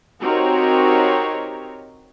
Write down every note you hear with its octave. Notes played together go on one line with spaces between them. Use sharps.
C4 D#4 F#4 G4 A#4 C#5